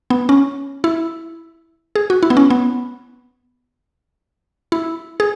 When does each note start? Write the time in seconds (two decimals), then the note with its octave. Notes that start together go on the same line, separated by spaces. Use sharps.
0.10 B3
0.29 C#4
0.84 E4
1.95 G#4
2.10 F#4
2.23 E4
2.30 B3
2.37 C#4
2.50 B3
4.72 E4
5.20 G#4